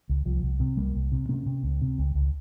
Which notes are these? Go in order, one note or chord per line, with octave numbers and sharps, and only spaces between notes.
C#2
C2 F3
C2
C3
C2 G3 A#3
C2
C3
C3 A#3 C#4
C3
C#2
C3
C#2
C#2